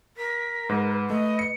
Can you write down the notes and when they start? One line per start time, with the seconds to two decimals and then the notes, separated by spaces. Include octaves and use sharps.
0.17 A#4 B6
0.69 G#2 B4
1.10 A3 D#5
1.39 C#7